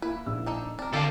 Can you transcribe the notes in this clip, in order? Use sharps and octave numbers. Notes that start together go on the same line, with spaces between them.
A#3 E4 B4
A#1 E6
D4 D#4 A4
C4 D4 A#4
D3 G4 A4 F5 A5